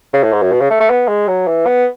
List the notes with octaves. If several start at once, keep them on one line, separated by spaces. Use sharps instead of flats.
C#3
A2
G#2
F#2
B2
C#3
A3
A3
B3
G#3
F#3
E3
B3